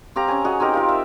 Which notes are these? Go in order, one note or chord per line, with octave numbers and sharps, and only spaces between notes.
C4 G4 F5 A#5
C#4 G#5
F#4 G#4 D#5
C4 D#4 G4 A#4
F4 A#4 F5
E5